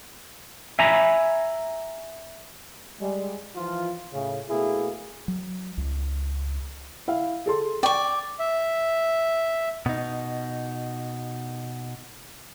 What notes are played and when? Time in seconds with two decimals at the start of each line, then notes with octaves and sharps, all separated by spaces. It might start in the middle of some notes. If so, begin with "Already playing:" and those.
0.79 E5 G#5 A#5 B5
3.01 G3 G#3
3.56 E3 F3 F4
4.13 A2 C#3
4.49 B2 A3 A#3 E4 G#4
5.28 F#3
5.77 C#2
7.08 E4 E5 F5
7.46 G#4 A4 C6
7.83 D5 G5 C#6
8.39 E5
9.86 B2 D#4